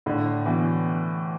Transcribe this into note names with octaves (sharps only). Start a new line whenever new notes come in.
A2 D3
B2 E3